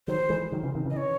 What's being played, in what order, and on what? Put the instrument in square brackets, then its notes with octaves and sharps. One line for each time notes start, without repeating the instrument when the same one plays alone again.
[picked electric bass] D#3 F#3 [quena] C5
[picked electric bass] E3 G#3
D#3 F#3
C#3 E3
C3 D#3
[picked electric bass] C#3 E3 [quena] D#5
[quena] C#5